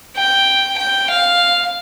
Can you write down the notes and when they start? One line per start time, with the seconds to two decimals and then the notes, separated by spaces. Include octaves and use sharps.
0.17 G5
0.79 G5
1.10 F5